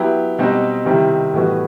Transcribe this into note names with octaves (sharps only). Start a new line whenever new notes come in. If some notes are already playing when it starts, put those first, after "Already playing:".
Already playing: F#3 B3 E4 G4
B2 G3 C4 D#4
C3 D#3 G3 C4 E4
A2 E3 G3 B3 F#4